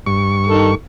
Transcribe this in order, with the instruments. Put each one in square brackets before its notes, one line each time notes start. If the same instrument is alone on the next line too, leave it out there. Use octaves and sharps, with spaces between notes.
[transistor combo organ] G2 C#6
[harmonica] D#3 A4